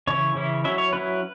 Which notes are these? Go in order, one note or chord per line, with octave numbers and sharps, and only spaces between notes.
C#3 E3 C#4 E4 C#5
C#3 E3 C#4 E4
F#3 C#4 E4 E5
C#5
F#3 C#4 E4 B4